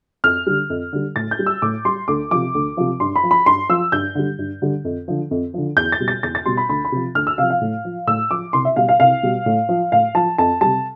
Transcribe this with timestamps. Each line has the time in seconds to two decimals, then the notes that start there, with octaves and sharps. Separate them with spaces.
0.24 F2 F6
0.47 D3 G3
0.70 F2
0.93 D3 G3
1.16 A2 A6
1.31 G6
1.39 G3
1.46 E6
1.62 A2 D6
1.85 G3 C6
2.08 D2 D6
2.31 C3 F3 D6
2.55 D2
2.77 C3 F3
3.00 G2 C6
3.16 B5
3.23 F3
3.31 B5
3.46 G2 C6
3.69 F3 E6
3.92 G2 G6
4.15 D3 G3
4.39 G2
4.62 D3 G3
4.85 F2
5.08 D3 F3
5.31 F2
5.54 D3 F3
5.77 E2 G6
5.92 A6
6.00 B2 G3
6.08 A6
6.23 E2 A6
6.35 A6
6.46 B2 G3 C6
6.57 B5
6.69 D2 B5
6.85 B5
6.92 C3 F3
7.15 D2 F6
7.27 E6
7.38 C3 F3 F5
7.50 F5
7.61 A2
7.85 F3
8.07 A2 E6
8.31 F3 D6
8.53 C2 C6
8.65 E5
8.76 B2 G3 F5
8.89 F5
9.00 C2 F5
9.23 B2 G3
9.46 A2
9.69 F3
9.92 A2 F5
10.15 F3 A5
10.38 F2 A5
10.61 C3 G3 A5